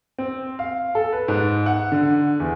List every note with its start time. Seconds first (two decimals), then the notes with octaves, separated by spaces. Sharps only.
0.18 C4
0.59 F5
0.95 A4
1.12 B4
1.28 G#2
1.66 F#5
1.92 D3
2.40 E2